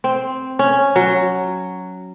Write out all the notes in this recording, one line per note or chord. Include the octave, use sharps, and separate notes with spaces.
C4
C#4
F#3